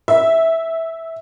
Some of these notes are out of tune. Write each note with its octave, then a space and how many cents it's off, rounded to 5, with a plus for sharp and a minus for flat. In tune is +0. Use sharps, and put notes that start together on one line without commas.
E5 -10